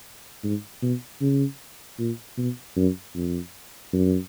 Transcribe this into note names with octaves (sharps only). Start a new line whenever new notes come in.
G#2
B2
C#3
A#2
B2
F#2
F2
F#2